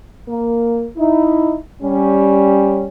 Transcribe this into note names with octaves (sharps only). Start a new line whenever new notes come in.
A#3
D#4 E4
G3 C#4